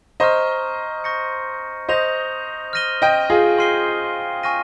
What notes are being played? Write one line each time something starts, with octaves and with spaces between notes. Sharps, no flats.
C5 D#5 A#5 C#6 F6
C#6 G6 A#6 C#7
C5 D#5 D#6 G6 A#6 F7
F6 A#6 D#7 G7
D#5 G5
F4 G#4
C6 F6 C7 D#7 G7
G#5 C#6 F6 A#6 D#7